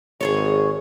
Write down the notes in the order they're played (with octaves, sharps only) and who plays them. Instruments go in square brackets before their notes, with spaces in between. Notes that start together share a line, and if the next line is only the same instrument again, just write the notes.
[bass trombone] G#1 [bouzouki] G#4 A4 C#5